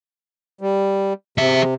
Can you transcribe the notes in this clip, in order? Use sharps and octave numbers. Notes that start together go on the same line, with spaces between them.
G3
C3 G#4 E5